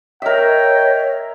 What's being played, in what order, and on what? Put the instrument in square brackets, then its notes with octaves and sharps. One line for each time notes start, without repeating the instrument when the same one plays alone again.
[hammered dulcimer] A#4 E5 [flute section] C#5 D#5 [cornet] G5